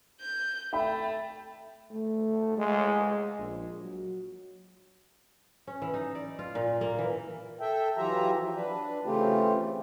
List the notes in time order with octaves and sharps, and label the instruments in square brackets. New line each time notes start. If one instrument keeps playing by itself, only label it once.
[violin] G6
[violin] A3 [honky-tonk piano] E5 G5 B5
[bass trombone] A3
G#3
A#1
F#3
[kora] C#4
E3
D#4
D5
F4
A#2
A#3
E3
[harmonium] A4 E5 G5
E3 F#3 F4 G4 E5 A#5
F3
D4 B4
C#3 E3 A3 C4 F4 G4